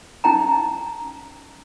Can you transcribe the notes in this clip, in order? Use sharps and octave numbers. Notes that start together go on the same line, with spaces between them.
C#4 D#4 G5 A#5